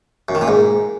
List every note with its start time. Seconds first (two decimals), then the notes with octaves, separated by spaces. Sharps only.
0.29 F#2
0.35 D#3
0.41 A#2
0.48 G#2